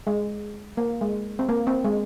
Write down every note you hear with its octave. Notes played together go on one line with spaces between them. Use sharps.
G#3
A#3
G#3
C4
A#3
C4
G#3